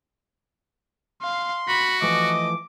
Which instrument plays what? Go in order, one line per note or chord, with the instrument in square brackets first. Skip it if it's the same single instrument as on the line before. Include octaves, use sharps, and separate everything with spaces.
[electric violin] F5 [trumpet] C6
[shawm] F#4 [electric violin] B5
[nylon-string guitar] E3 F3 A3 [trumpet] D#5 [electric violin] D6